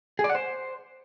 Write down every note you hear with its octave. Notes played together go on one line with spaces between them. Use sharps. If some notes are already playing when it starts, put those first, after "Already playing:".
G#4
D5
F#5
C5